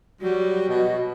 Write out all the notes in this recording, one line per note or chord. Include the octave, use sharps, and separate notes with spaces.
F#3 G3 F#4
B2 D#5